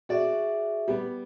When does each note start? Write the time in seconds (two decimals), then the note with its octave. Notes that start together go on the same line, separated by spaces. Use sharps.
0.09 F#4 G#4 D5 E5
0.88 G3 B3